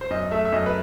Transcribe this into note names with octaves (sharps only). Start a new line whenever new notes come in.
C5
F#2 D#5
A3 E5
E5
F#2 D#5
B4